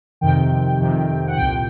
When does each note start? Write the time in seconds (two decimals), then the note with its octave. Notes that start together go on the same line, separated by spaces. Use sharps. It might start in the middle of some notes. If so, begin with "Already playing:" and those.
0.21 F2 C3 D#3 G5
0.80 F2 C3 D#3
1.27 F#5
1.37 C2 A#2 G5